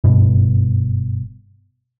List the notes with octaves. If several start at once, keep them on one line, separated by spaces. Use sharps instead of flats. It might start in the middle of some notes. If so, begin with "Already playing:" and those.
F#1 G2 B2